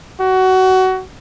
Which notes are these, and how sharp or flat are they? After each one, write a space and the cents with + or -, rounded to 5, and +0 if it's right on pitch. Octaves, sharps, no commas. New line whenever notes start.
F#4 +20